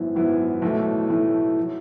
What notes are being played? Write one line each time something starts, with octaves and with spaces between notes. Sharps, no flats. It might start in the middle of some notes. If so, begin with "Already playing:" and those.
Already playing: G#1 F#2 E3 B3 E4
G#1 F#2 E3 B3 E4
B1 A2 E3 A3
B1 A2 E3 A3
F#3